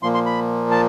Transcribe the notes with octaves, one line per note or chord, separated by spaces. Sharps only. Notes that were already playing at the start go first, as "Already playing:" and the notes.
A#2 F3 A#3 C6
C6
B5
A5